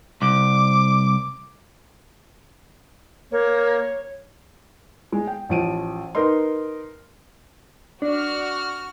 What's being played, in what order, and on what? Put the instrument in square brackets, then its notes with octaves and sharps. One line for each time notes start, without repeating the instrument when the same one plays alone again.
[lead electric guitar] C2 [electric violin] D6
[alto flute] A#3 [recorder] C#5
[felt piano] G#3
G5
A1 F3 D7 D#7
D#4 A#4 B4 D#5 C6
[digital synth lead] D4 [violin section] F#4 F6